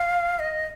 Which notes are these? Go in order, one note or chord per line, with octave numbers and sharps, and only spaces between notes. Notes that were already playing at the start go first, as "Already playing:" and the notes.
Already playing: F5
D#5